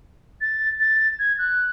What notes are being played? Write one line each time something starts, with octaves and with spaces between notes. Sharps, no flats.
A6
A6
G#6
F#6